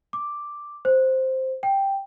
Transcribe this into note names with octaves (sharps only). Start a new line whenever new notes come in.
D6
C5
G5